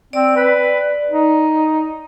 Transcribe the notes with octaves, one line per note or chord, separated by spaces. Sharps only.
C4 D5
B4
D#4